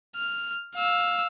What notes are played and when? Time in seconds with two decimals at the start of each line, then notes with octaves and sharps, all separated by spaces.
0.16 F6
0.76 F5 E6